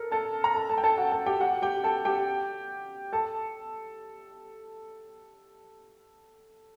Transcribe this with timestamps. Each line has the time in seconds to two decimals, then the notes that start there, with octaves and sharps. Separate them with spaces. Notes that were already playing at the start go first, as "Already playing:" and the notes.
Already playing: A4 A#4
0.11 A4 A5
0.44 A#5
0.55 A4 A5
0.69 A4 A5
0.78 G5
0.83 A4 A5
0.98 F#4 F#5
1.12 A4 A5
1.26 G4 G5
1.41 F#4 F#5
1.62 G4 G5
1.84 A4 A5
2.05 G4 G5
3.13 A4 A5